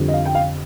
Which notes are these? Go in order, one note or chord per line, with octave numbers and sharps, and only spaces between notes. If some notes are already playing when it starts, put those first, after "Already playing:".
Already playing: F2 D3 G3
D#5
F5
G5
F5